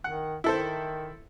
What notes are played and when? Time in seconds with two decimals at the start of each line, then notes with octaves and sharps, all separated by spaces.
0.04 D#3 F#5
0.44 D#3 E4 A4 C5